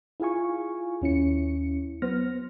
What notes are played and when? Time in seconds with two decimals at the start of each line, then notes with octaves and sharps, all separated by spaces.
0.20 E4 F4 G#4 F5 G#5 C#6
1.02 D#2 C#4 E4 C#7
2.02 F#3 B3 C5 F6 A#6